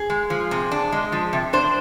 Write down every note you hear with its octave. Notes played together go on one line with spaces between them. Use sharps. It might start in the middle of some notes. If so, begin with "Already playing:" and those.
Already playing: G#4
G#3
F3
C3
D4
G#3
F3
C3
D4 C5